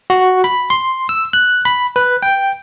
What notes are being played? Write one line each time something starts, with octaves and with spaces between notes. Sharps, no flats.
F#4
B5
C6
E6
F#6
B5
B4
G5